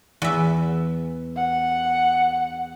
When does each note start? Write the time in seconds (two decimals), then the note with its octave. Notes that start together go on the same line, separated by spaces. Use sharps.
0.22 E2 E5
1.36 F#5